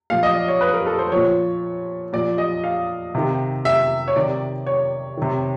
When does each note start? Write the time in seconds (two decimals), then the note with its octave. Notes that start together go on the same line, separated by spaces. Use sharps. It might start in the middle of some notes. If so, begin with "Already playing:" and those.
0.10 A#2 F3 F5
0.23 D#5
0.35 D5
0.48 C#5
0.61 B4
0.74 A#4
0.86 A4
0.99 C5
1.12 A#2 F3 C#5
2.13 A#2 F3 D5
2.38 D#5
2.64 F5
3.15 C3 D#3
3.65 E5
4.08 C#5
4.16 C3 D#3 D5
4.66 C#5
5.17 C3 D#3